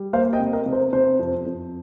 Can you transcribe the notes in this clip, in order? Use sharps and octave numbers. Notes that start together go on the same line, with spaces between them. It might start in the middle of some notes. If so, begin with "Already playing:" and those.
Already playing: G3
A#3 C5 F5
D#5 G5
C3
A#4 D#5
C3
C5
C3 C5
F2
F2